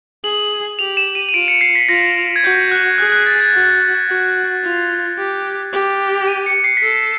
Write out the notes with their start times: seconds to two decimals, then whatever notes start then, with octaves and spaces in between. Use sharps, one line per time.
0.24 G#4 F#7
0.79 G4 F7
0.97 E7
1.15 D#7
1.29 D#7
1.34 F4 D7
1.48 C#7
1.61 C7
1.75 B6
1.88 F4 A#6
2.36 G#6
2.44 F#4 G6
2.72 F#6
2.98 G#4 F#6
3.12 F#6
3.27 A6
3.41 G#6
3.53 F#4 A6
4.08 F#4
4.63 F4
5.18 G4
5.73 G4
6.28 D#7
6.46 C#7
6.64 C7
6.77 B6
6.83 A4 C7